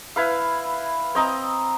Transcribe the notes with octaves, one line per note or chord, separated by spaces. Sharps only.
E4 B4 F5
C4 D#5 A#5